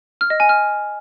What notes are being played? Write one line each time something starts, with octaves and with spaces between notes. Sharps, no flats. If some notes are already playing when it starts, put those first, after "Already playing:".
F6
D#5
G#5
F6